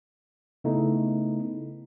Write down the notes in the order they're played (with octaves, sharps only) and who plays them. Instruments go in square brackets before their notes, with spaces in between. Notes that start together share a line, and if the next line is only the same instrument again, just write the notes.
[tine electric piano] C#3 A3 B3 D#4 E4